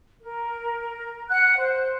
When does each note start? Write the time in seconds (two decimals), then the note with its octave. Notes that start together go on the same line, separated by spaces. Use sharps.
0.22 A#4
1.29 F#5 F#6
1.59 C5